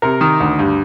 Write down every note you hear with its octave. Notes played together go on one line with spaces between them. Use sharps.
C3 A#4
D#3
D2
G2